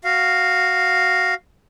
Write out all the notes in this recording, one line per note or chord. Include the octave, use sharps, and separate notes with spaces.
F#4 F5